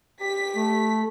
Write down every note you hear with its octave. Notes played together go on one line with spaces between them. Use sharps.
G4 B6
A3